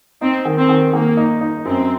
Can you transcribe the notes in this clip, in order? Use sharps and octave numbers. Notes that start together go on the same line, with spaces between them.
C4 D#4
D#3
C4
D#3
D#3 A#3
D#4
D#4
F#2 C4